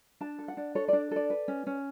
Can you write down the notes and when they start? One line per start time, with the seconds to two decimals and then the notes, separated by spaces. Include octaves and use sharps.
0.21 D4 A5
0.39 A4
0.48 F#5
0.57 D4
0.75 A4 C#5
0.88 D4 D5
1.11 A4 D5
1.30 B4
1.48 C#4
1.67 C#4